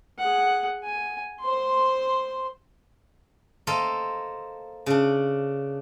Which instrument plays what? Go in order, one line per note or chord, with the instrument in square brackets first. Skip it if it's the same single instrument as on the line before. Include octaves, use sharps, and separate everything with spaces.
[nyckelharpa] G#4 F#5
G#5
C5 C6
[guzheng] A#3 A4 A#4 C5 D#5
C#3 D4